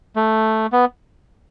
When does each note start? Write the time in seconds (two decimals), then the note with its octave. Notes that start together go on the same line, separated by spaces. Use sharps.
0.16 A3
0.72 B3